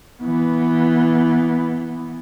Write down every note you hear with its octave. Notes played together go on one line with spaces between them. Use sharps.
E3 B3